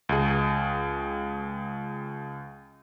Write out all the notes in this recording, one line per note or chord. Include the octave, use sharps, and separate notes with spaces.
C#2 G#4